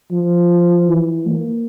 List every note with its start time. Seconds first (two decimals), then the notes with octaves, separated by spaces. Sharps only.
0.12 F3
0.89 E3
1.28 A#3